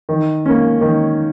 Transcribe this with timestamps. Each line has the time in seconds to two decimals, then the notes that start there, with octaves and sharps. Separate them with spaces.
0.09 D#3
0.46 A#3 C#4
0.81 D#3